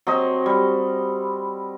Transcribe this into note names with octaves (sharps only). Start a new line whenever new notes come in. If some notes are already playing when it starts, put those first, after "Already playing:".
F#3 C4 D#5
G3